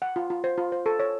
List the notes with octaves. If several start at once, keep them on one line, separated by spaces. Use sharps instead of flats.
F#5
F4
F4
C5
F4
C5
A4
C#5